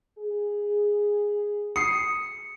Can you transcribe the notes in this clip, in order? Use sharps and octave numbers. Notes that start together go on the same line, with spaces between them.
G#4
D#6 C7 C#7